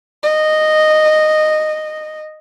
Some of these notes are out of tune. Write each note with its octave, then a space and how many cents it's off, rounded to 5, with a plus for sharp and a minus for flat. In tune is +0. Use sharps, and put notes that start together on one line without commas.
D#5 -10